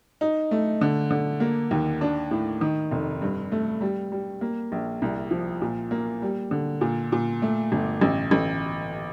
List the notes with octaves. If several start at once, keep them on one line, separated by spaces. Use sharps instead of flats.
D#4
A3
D3
D3
A#3
D#2
D4
A2
D#3
F1
G2
A3
G3
G3
A#3
A#1
C2
F3
A#2
A#3
G3
D3
A#2
A#2
A3
G1
A1
A1